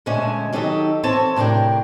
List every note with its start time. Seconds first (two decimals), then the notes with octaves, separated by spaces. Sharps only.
0.06 A#2 D3 G#3 A3 C#4 D4
0.53 D#3 F#3 D#4 G4 A4
1.03 E3 C4 A4 C#5 A5
1.36 A2 C3 D4 A#4 G5